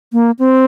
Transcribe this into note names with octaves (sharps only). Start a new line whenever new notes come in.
A#3
C4